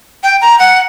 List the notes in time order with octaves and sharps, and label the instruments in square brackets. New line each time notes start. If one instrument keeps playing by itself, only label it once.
[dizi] G5
A#5
F#5